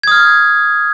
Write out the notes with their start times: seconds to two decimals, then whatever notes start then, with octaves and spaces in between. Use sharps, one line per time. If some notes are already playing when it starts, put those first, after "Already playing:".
0.03 G#6
0.08 D#6
0.12 F6